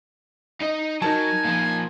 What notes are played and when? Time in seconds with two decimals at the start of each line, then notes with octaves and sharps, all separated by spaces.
0.61 D#4 D#5
1.02 F#3 D#4 A#4 G#5 A5
1.45 A#2 F3